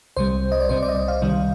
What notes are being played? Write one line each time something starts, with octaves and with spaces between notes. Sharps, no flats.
C2 C3 G3 C5
D#5
D5
C2 C3 G3 C5
D5
D#5
D5
F5
C2 C3 D#3 G3